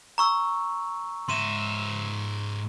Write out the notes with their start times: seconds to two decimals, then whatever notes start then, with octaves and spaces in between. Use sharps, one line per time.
0.18 A#5 C#6 E6
1.29 G#2 E5 C6 D#7 E7